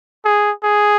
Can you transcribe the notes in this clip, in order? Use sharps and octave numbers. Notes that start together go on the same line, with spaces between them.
G#4
G#4